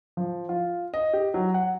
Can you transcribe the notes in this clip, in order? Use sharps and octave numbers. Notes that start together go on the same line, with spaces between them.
F3
F4
D#5
G4
F#3
F#5